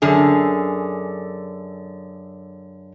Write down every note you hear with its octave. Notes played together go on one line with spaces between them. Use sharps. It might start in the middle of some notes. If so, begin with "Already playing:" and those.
F#2 D3 G#4